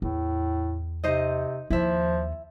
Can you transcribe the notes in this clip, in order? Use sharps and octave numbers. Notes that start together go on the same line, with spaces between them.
E2 A2
C3 D#4 C5 D#5
D#2 F3 E4 E5